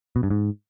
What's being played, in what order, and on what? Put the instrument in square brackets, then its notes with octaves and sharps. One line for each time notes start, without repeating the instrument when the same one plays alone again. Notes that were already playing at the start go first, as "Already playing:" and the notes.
[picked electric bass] B2
G2
G#2